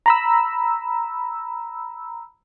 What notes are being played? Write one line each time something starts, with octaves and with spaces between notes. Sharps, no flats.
A#5 B5 E6